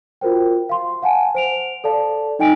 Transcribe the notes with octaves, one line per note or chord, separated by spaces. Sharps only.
F4 F#4 A#4 C5 G5
F5 C6
F5 F#5 G#5 A5
C5 D7 F7
A4 D5 F5 A5
D#4 D#5 G5 G#5 D7